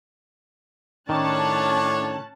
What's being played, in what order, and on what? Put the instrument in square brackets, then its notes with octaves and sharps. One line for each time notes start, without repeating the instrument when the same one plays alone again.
[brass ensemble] A2 C#5 [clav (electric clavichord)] D#3 [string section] C#4 A5 F#6 [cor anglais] D4